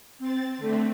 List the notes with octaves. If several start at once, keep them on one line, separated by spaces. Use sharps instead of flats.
C4 A6
D3 A3 C4